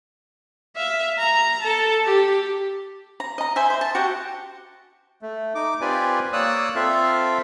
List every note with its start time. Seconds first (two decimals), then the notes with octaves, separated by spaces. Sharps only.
0.76 E5 F5
1.19 A#5
1.64 A4 A5
2.05 G4
3.20 A#5
3.38 D#5 A#5
3.56 C5 E5 G#5
3.70 C5 C6
3.81 A5
3.95 F#4 G4 F#5
5.22 A3
5.55 D#4 D6
5.81 C4 F4 G4 B4 D5 G#5
6.33 A#3 C#5 D5 D#6 E6 F#6
6.75 C4 F4 A4 E5 F5